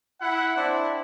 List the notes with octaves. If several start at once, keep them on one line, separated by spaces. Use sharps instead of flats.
E4 F#5
C4 D4 E4 C5